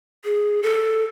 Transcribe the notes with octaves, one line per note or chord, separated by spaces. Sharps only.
G#4
A4